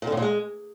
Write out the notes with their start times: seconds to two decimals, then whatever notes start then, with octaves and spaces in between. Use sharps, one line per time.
0.02 A#2
0.07 D3
0.12 A2
0.17 A#2
0.22 G#3